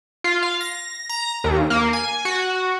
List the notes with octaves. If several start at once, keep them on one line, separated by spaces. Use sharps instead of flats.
F4
F5
A#6
A#5
D#2
A#3
G#5
F#4